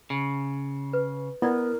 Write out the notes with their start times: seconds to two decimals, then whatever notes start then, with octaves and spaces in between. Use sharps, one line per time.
0.10 C#3
0.93 B4
1.42 B3 E4 A#4 D5